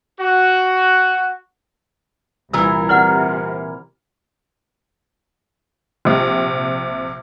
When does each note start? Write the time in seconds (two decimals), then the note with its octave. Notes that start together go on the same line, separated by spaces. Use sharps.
0.19 F#4
2.53 C2 A#2 E3 A#4 A#5 E6
2.89 C3 E4 D5 F#5 F6
6.05 A#1 C3